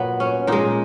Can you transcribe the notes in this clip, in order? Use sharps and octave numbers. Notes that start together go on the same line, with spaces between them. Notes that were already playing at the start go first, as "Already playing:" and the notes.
Already playing: A#2 F#3 B3
C#4
A#2 G#3 D#4